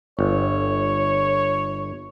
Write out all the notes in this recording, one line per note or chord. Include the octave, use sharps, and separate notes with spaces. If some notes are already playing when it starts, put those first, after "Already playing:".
G1 C#5